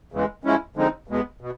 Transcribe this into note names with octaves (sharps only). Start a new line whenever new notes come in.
E2 C#3 E3 G#3
G#2 F3 G#3 C#4 E4
D3 F3 G#3 C4 D#4
E2 B2 G#3 B3
B2